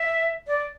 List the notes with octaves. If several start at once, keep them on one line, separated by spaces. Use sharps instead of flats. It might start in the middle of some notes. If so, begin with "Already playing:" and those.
Already playing: E5
D5